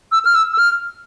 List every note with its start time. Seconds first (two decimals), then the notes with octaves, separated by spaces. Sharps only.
0.12 E6
0.25 F6
0.35 E6
0.53 E6
0.58 F6